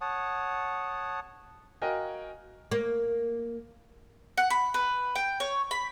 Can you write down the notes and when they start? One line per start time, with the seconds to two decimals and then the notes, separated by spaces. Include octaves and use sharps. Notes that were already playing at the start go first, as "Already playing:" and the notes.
0.01 C#5 F#5 A5 D#6
1.82 F#4 A#4 D#5 F5 G5 G#5
2.72 A#3
4.38 F#5
4.50 B5
4.74 B4
5.15 G5
5.40 C#5
5.71 B5